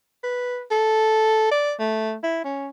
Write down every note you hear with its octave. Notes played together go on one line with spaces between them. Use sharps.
B4
A4
D5
A3
E4
C#4